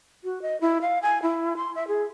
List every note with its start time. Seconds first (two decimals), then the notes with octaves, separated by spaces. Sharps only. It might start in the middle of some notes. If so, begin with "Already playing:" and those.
0.24 F#4
0.42 D#5
0.61 E4
0.81 F5
1.02 G#5
1.22 E4
1.56 C6
1.75 E5
1.88 G#4